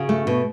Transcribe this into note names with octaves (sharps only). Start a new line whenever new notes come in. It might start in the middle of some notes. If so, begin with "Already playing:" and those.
Already playing: C#3 F#4
A3
B2